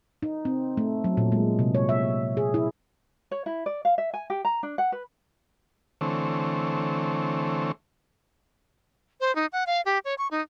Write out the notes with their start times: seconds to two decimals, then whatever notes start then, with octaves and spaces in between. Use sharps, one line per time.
0.23 D#4
0.45 C4
0.77 A3
1.04 F#3
1.17 A#2
1.32 G#3
1.59 C3
1.75 C#5
1.89 E5
2.37 G#4
2.54 E4
3.31 C#5
3.46 E4
3.66 D5
3.85 F5
3.98 E5
4.14 G#5
4.30 G4
4.45 A#5
4.63 D4
4.78 F#5
4.92 B4
6.01 D3 E3 A3 C4 C#5
9.21 C5
9.36 D#4
9.53 F#5
9.67 F5
9.86 G4
10.05 C#5
10.18 C#6
10.31 D#4